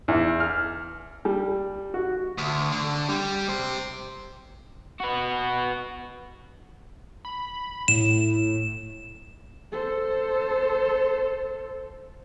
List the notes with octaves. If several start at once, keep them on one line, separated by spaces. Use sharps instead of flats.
E2
F6
G3
F#4
D2
D3
G3
G4 C5
F#4 B4
B5
A2 E7
A4 C5